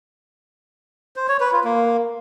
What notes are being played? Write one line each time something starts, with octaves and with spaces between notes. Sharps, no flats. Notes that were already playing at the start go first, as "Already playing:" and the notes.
C5
C#5
B4
F4
A#3